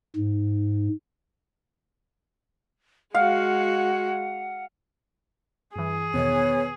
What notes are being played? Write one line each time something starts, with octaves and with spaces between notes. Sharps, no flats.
G#2
G#3 F#4 F5 F#5
G2 E3 G#4
E2 B2 D#3 B3 C#5